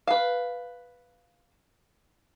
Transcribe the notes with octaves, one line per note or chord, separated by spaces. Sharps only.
B4 F5